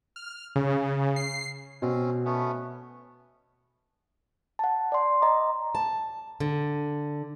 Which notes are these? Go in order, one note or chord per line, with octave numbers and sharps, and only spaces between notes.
F6
C#3
C7
B2 C4 C#4
A3 B3 C#4
F#5 A5
D5 C6
D#5 A#5 D6
A5
D3